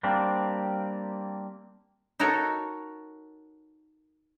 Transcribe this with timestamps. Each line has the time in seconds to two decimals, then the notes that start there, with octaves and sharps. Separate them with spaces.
0.03 G3 A#3 C4 D4
2.20 D#4 F#4 A4 A#4 C#5